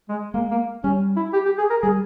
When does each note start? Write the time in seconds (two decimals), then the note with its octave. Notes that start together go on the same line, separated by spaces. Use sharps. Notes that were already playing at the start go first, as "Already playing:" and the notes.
0.09 G#3
0.34 G#3 A#3
0.51 A#3
0.84 G3 C#4
1.16 E4
1.33 G4
1.46 G4
1.58 G#4
1.70 A#4
1.82 G3 G#4